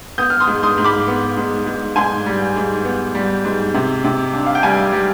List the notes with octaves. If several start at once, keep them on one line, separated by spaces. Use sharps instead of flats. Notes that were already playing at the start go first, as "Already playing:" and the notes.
B3 D#6 G6
F6
C6 D#6
G#2
C6 D#6
G#2
B5 D6
B3
G#2
G#2
G#2 G#5 C6
G3
G#2
B3
G3
G#2
C3
C3
D4
F5
G5
G3 F5 G#5
G3